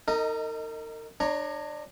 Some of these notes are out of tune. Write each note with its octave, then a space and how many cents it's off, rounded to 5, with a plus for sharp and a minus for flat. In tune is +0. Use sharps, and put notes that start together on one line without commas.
D#4 +0 A#4 -40 D#5 +15
D4 +30 C#5 +0 A#5 +0